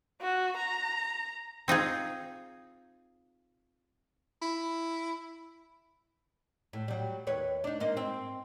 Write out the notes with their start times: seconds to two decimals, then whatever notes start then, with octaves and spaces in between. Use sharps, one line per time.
0.21 F#4
0.57 A#5
1.68 C4 D#4 F4 G#4
4.42 E4
6.73 A2
6.88 F#3 G3
7.27 D#2 B4 C#5
7.64 D4 D#4
7.80 G#2 A#3 D#5
7.97 C4